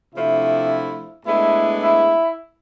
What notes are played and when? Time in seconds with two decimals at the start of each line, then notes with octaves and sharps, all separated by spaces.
0.15 C3 F3 A3 D4 E4
1.26 A2 G#3 B3 D4 E4
1.81 E4